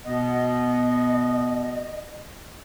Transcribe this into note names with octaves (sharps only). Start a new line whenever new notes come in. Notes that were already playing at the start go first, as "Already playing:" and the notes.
B2 B3 D#5